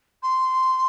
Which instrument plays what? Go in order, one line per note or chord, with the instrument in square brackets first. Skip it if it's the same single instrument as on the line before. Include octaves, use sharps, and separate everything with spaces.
[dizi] C6